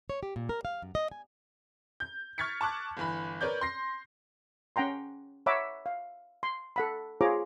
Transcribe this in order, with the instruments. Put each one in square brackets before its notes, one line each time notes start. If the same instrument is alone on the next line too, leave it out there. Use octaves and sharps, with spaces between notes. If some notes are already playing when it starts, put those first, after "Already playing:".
[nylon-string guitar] C#5
G4
A#2
A#4
F5
F#2
D#5
G#5
[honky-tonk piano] G6
C#6 F6 G#6 A6 B6 C#7
A5 C#6 D6 F#6
G1 E3 B5
A#4 B4 C#5 D5 G6
C6 A#6 C7
[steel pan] C#4 F#5 G5 A#5 C6
C#5 E5 F#5 A#5 B5 D6
F5
C6
A4 F#5 B5
F4 G#4 C5 C#5 A#5 D6